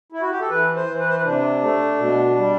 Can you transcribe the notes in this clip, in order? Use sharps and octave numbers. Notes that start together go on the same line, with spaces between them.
E4
F#4
G4
A4
E3 B4
C5
E3
B4
C5
B4
C3 D4
A3
B2
G3